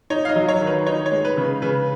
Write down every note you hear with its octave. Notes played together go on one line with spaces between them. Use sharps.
D#4 C#5
F5
D#5
F#3
C#5
D#3
B4
D#4 C#5
C#5
G#3
B4
C#3
C#3 B4